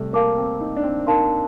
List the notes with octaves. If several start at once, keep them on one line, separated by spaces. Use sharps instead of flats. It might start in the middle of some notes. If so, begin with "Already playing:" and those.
Already playing: C3 G3 A3
A#3 A#4 F5 A5 D6
C4
D#4
D4
C4
D#4 A#4 F5 A5 C6